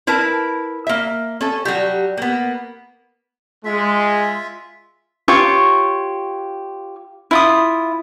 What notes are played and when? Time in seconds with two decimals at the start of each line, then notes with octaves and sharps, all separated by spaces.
0.07 E4 A#4 B4 A5
0.87 A#3 E5
1.41 C#4 A4
1.65 F#3 G3 G4
2.17 A#3 B3
3.65 G#3 F4 E5
5.28 F4 G4 C#5 C#6
7.31 E4 F4 D#6